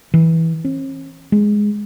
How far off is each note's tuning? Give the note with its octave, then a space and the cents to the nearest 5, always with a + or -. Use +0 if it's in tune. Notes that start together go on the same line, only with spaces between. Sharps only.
E3 -15
C#4 -45
G#3 +0